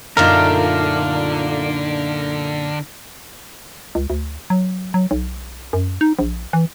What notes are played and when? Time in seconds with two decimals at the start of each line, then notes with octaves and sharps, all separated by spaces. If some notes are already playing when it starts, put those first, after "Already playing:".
0.17 F#2 A#2 D3 A3 D4 D#4 F4 A#4
3.95 C#2
4.10 D2
4.50 F#3
4.94 F#3
5.11 B1
5.73 F#2
6.01 D#4
6.19 A#1
6.53 E3